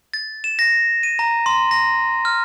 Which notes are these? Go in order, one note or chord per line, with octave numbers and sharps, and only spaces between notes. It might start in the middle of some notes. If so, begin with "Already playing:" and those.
A6
E7
A#6
D#7
A#5
C6
A#6
F6